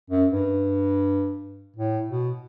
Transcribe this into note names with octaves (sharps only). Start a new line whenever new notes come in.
F#2
G2
A2
B2